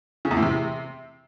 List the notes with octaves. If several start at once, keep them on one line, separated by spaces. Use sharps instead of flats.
C#3
E2
A2
C3